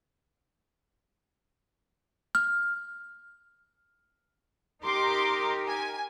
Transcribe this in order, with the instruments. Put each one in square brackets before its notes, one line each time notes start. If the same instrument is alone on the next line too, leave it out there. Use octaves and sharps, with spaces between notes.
[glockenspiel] F6
[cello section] D#4 G4 A#4 [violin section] C6 D6
[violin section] G#5